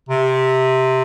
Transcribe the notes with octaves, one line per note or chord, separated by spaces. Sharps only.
C3